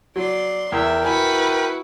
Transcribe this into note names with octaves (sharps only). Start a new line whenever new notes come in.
F#3 D5 C6
E2 A#4 E5 G5
E4 F#4 B4 G#5